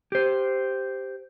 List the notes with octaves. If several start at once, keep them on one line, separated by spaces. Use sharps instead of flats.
G4 C5